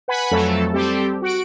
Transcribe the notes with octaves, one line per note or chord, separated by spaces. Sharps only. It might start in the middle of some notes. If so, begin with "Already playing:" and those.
B4 F#5 G#5 B5
F2 F#3 A3 A4
G3 C4 G4 A4
F#4 D7